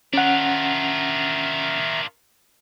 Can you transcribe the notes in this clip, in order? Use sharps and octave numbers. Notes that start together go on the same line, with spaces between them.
D#3 C#4 D4 F4 E5 F#5 A#5